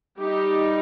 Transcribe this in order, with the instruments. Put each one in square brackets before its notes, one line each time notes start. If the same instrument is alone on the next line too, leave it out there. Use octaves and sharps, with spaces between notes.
[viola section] G3 D#4 G4